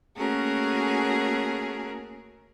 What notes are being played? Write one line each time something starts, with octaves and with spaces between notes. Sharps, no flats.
A3 A#3 C#4 F#4 G#4 A#4